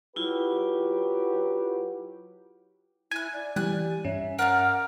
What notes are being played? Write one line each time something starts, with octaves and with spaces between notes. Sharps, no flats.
F#3 E4 F4 G4 B4
E4 G#5 F#6 G6
D5
E3 G3 G#5 F#6
G2 C#4 E5
A#4 D5 F5 F#5 A#5